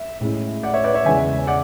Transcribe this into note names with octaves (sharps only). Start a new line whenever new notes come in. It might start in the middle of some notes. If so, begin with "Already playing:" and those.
Already playing: E5
A2 G#3 C#4 E4
D5 F#5
C#5 E5
B4 D5
C#5 E5
E2 C#3 E3 G#3 E5 G#5
D5 F#5